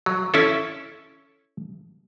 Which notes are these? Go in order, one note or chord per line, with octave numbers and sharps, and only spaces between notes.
F#3
C#4 E4 A4